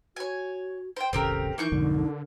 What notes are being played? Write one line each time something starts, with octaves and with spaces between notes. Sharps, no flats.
F#4 C#5 G#5
C5 G5
E1 A1 C#3 C4 G4 A4 A#4
E3 A#3 D#4 C#6 G6
B1 F2 G#2 D3